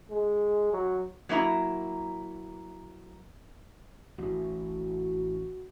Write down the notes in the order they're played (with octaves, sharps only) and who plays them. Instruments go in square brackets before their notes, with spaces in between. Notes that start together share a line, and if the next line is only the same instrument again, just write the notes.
[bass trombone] G#3
F#3
[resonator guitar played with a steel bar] F#3 A#3 E4 C5 A#5
[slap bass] A1 A2 [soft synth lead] F#4